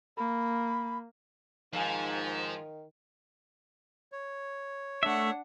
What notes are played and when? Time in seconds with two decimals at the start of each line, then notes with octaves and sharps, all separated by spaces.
0.17 A#3 B5
1.73 G#2 D#3 F3 F5 G#5
4.12 C#5
5.03 A3 D4 E5 F#5